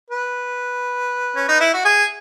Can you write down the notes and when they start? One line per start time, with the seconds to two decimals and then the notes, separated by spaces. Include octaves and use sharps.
0.10 B4
1.36 C#4
1.48 D#4
1.60 E4
1.73 F#4
1.85 G#4